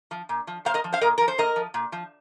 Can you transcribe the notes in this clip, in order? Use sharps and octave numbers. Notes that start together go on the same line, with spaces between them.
F3
A#2
F3
A#2 C5 F5
A#4 D#5
F3
C5 F5
A#2 A#4 D#5
F3 A#4
C5
A#2 A#4 D#5
F3
A#2
F3